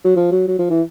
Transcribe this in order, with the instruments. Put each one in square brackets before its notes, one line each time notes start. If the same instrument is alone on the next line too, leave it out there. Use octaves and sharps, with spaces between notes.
[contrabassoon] F#3
F3
F#3
F#3
F3
E3